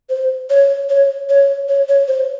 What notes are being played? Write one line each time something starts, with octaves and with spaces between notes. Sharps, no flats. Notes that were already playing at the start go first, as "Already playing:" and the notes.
C5
C#5
C#5
C#5
C#5
C#5
C5